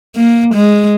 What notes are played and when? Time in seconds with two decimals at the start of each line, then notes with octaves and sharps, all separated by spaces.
0.16 A#3
0.55 G#3